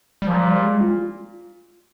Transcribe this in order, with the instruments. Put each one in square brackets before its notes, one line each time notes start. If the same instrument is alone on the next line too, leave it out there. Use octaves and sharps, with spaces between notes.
[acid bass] G3
[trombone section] A#2 [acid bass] F3
[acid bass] G3
G#3
F4